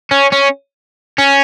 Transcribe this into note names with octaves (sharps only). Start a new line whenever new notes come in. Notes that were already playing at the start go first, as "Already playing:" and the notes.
C#4
C#4
C#4